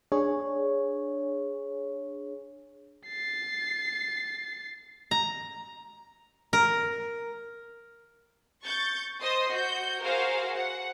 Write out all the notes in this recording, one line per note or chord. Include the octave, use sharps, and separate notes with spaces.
D4 G#4 C#5
A6 C7
A#5
A#4
C#6 G6 A6
C5 D#5 C6 D#6
F#4 G6
F#4 G#4 A#4 C5 F5
F#5